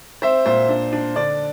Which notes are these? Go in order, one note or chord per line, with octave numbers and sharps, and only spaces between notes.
C4 C5 E5
A#2 C5
D4
D4
D3 D5